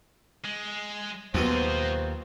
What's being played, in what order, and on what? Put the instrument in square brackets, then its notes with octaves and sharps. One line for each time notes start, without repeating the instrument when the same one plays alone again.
[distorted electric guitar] G#3
[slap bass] D#2 [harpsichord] F3 F#3 B3 [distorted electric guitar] F#4 D#5 [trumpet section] C5